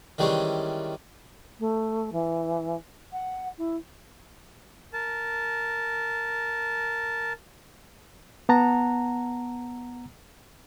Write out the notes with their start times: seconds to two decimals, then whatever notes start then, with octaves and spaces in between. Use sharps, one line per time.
0.18 D#3 E3 G3 G#3 C#4
1.59 A3
2.12 E3
3.12 F#5
3.58 E4
4.93 A#4 A5
8.49 B3 F#5 A5 A#5